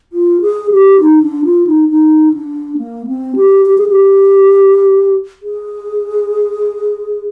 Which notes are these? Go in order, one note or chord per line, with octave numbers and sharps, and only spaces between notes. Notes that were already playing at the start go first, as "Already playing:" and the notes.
F4
G#4
G4
D#4
D4
F4
D#4
D#4
D4
A#3
C4
G4
G4
G#4
G4
G#4